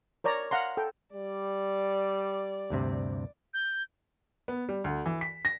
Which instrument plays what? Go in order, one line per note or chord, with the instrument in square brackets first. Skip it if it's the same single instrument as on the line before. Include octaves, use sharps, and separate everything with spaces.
[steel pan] A#4 C#5 D5 A#5
F5 F#5 A#5 C6
A4 G5
[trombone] G3 [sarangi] D5
[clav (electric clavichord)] D2 G2 C3
[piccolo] G6
[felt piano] B3
G3
D2
E3
B6
A#6